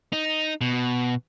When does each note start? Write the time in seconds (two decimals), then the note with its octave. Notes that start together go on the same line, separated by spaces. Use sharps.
0.13 D#4
0.61 B2